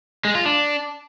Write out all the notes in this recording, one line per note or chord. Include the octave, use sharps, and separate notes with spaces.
G#3
F4
D4